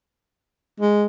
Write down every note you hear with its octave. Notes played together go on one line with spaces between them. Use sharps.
G#3